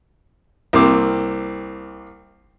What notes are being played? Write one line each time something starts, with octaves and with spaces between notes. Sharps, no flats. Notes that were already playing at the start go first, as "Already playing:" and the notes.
C2 A#3 C4 D6